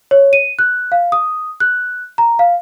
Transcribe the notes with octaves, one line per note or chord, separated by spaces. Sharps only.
C#5
D#7
F#6
F5
D#6
F#6
A#5
F5